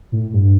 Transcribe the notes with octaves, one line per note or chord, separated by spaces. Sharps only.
A2
G2